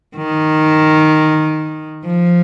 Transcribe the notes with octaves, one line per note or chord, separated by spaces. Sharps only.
D#3
F3